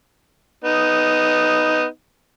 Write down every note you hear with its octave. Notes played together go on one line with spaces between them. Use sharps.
B3 D#4